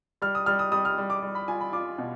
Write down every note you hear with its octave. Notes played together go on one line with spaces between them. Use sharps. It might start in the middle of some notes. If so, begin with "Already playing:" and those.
G3 F6
D#6
G3 F6
D#6
G3 D#6
F6
G3
D6
G3
B5
F4 G#5
B5
F4 D6
B2